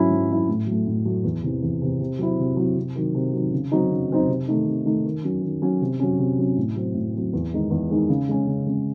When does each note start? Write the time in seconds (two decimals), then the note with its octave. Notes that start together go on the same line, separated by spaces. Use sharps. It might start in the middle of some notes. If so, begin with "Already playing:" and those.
Already playing: G#2 F#3 C#4 E4
0.10 G#2
0.29 F#3 C#4 E4
0.48 A2
0.66 F#3
0.71 A3
0.87 A2
1.05 F#3 A3
1.24 E2
1.43 C3 E3
1.63 E2
1.81 C3 E3
2.00 C3
2.19 F#3 C4 E4
2.39 C3
2.57 F#3 C4 E4
2.77 C3
2.96 D#3 F#3
3.14 C3
3.33 D#3 F#3
3.52 C#3
3.72 F#3 C4 D#4
3.91 C#3
4.10 F#3 C4 D#4
4.28 C3
4.48 D#3 A3 D#4
4.67 C3
4.86 D#3 A3 D#4
5.05 D#3
5.23 F#3 C#4
5.42 D#3
5.62 F#3 C#4
5.81 C3
6.00 F#3 C#4
6.19 C3
6.38 F#3 C#4
6.56 A2
6.76 F#3 C4
6.94 A2
7.14 F#3 C4
7.33 E2
7.53 D#3 G#3 D#4
7.71 E2
7.90 D#3 G#3 D#4
8.09 C#3
8.29 G#3 C#4
8.46 C#3
8.66 G#3 C#4